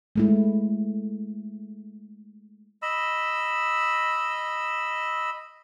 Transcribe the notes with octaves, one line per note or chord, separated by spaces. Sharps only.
G#3 A3 E4
D#5 B5 E6